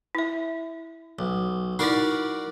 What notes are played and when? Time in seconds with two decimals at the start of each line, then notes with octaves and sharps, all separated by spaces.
0.15 E4 E5
1.19 B1
1.79 D#4 E4 F#4 A#4 D5